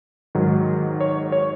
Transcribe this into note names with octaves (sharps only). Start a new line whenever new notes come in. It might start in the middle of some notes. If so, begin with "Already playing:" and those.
G#2 D#3 F#3
C#5
C#5